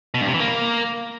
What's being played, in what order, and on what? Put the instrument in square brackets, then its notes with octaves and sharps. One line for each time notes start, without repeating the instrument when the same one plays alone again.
[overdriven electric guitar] B2
G2
C3
E3
A#3